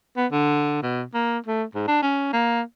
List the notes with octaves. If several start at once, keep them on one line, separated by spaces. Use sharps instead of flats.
B3
D3
B2
A#3
A3
G#2
D4
C#4
A#3